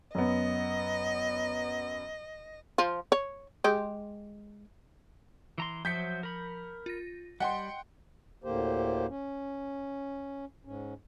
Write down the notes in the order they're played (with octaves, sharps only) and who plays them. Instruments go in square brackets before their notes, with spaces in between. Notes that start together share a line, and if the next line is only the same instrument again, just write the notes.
[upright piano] F#2 B3 [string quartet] D#5
[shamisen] F3 F4
C#5
G#3 G4
[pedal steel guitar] E3 A#5 C6
[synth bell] F3 [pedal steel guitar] F#3 C5 E5 [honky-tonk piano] G6 B6 C#7
[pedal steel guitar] A#4 B5
[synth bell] F4 A#6
[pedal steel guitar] G3 [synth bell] D#5 C#7 [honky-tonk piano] F#5 G5 C6
[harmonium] D2 A2 D3 A#3 G4 C5
C#4
G#2 C#4